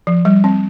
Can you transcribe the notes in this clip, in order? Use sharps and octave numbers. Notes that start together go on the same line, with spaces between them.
F3
G3
C4